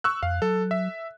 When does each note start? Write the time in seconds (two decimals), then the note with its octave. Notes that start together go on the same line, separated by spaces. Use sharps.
0.04 C#6 E6 F#6
0.23 F2 F5
0.42 F#3 A4
0.71 E5